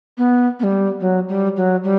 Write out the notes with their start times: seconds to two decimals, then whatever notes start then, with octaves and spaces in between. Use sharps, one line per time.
0.18 B3
0.60 B3
0.63 G3
1.00 F#3
1.29 G3
1.57 F#3
1.84 G3